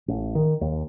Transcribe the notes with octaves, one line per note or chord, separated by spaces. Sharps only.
A1
D#3
D#2